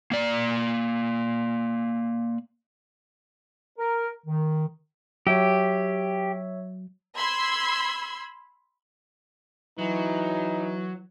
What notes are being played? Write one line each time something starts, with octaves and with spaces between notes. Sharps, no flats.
A#3 D5
A#4
D#3
F#3 G4 C#5 E5 E6
B5 C6 E6 G#6
E3 F#3 D#4